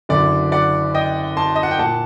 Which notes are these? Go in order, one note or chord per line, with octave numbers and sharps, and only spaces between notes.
F#1 F#2 D3 D5
D5 F#5
D#5 G5
A5 C6
D#5
F#5
G5
A#2 F#5 A5